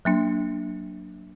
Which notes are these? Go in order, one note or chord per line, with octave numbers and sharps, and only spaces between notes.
F#3 A#3 D4